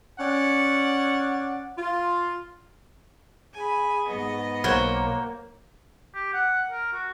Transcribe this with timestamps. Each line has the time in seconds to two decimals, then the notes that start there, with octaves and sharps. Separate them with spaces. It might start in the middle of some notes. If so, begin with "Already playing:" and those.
0.19 C#4 D5 F#5
1.77 F4
3.56 G#4 G#5 B5
4.09 G#2 B3 D#5
4.64 B1 A#3 F#4 C5 C#5
6.15 G4
6.34 F#5
6.71 A#4
6.93 F#4